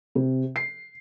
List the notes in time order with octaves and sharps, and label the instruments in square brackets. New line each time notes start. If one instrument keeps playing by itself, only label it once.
[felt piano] C3
C7